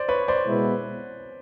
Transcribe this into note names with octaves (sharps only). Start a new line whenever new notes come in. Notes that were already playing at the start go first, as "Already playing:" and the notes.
Already playing: C5 D5
B4 C#5
C5 D5
B2 G#3 B3 E4